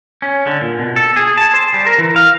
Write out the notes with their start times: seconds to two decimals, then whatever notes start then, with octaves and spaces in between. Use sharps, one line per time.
0.22 C#4
0.47 D3
0.61 A#2
0.79 B2
0.96 A4
1.16 G#4
1.37 A5
1.54 C5
1.74 G3
1.86 A#4
1.98 E3
2.16 F5